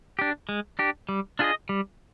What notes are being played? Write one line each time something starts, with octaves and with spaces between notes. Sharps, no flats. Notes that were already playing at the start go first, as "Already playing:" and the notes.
D4 G4
G#3
D4 G4
G3
D4 F4 G#4 D#5
G3